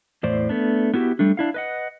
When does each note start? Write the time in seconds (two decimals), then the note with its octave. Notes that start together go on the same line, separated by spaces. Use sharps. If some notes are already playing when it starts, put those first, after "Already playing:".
0.23 E2 A2 C5 D5
0.49 A3 B3 D4
0.94 B3 E4 F#4 G4
1.19 G3 A3 D4
1.37 D4 E4 F5
1.54 B4 D#5 F#5